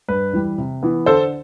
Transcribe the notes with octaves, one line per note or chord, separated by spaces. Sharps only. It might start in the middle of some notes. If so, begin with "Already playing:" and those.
G2 B4
E3 G3
C3
E3 B3
D3 A4 C5